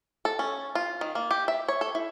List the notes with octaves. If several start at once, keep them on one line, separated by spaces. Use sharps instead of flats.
A4
C#4
F4
D#3
A#3
G4
E5
C#5
A4
E4